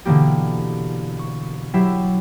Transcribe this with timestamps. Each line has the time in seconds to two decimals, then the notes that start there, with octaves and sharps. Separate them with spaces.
0.05 B2 D3 E3 A#3 G4
1.19 C#6
1.74 F#3 E4 G4 E5 C7